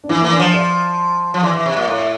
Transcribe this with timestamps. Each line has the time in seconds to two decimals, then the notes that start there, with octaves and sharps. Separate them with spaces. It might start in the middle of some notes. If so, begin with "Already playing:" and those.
0.04 D4
0.09 E3 E4
0.21 E3 A#3
0.32 D4
0.39 F3
0.54 D5
1.34 F3
1.43 E3 D5
1.53 E3 E5
1.65 C3 E5
1.76 A#2 E5
1.88 A2 F5
1.98 E5